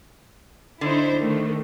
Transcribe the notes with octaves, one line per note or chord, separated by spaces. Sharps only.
D3 D#4 E4 C5
D#3 A3